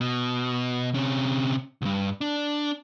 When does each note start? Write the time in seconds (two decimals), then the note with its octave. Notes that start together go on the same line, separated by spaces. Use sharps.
0.01 B2
0.94 C3 C#4
1.82 C2 G2
2.21 D4